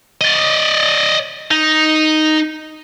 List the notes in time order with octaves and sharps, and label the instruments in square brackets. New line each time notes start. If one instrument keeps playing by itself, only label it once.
[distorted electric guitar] D5 D#5
D#4